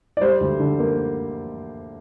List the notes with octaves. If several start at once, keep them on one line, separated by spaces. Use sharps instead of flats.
D5
G3 C5
D2
D3
A#3